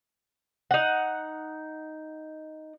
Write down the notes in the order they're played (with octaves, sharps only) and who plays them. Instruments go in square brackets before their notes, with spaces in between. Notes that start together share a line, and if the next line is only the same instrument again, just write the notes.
[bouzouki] D#4 F#5